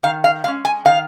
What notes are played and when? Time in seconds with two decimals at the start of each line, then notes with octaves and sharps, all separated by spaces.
0.03 D#3 F5
0.24 F5
0.44 G#3 C#4 F5
0.65 G#5
0.85 D#3 F5